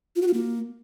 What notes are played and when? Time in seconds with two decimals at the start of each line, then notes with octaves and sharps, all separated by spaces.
0.16 F4
0.22 F#4
0.28 F4
0.34 A#3